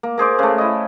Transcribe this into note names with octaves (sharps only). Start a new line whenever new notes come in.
A#3
A#3 G#4 C5 D6
C#3 A3
E4 D#5